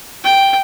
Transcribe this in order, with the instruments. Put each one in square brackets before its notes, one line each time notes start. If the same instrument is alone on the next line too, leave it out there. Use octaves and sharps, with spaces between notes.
[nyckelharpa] G5